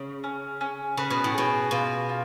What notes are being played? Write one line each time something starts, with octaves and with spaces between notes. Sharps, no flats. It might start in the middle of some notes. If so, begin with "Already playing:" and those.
Already playing: C#3
C#4
C#4
C#3 B4
B2
A2
B2 G#4
B2 F4
F4